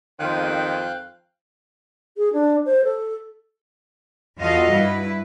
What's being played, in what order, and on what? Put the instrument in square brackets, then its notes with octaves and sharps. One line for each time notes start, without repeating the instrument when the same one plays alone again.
[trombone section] F2 C5 [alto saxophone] D#3 [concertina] F5 G5 F#6
[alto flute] G#4
D4
C5
A4
[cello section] E2 F4 F#4 A4 D#5 F5
G2 E4 B4